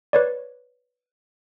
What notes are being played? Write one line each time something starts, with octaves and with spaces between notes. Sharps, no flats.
B4 C#5 D5